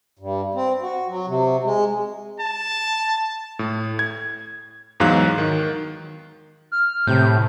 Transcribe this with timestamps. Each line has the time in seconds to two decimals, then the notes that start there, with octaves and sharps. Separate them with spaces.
0.19 G2
0.55 C4
0.82 F#4
1.08 F#3
1.27 C3
1.64 G#3
2.40 A5
3.59 A2
3.99 G#6
5.00 E2 G#2 F#3 F5 F#6
5.38 D#3
6.72 F6
7.07 A2 C3 G6